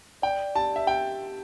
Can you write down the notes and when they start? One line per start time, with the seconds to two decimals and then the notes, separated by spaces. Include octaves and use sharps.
0.22 D5 G5
0.55 G4 A5
0.76 E5
0.87 G4 G5